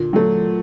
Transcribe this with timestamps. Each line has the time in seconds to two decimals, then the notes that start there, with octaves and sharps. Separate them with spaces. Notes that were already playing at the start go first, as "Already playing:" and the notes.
Already playing: A#2 D3
0.13 F#3 A3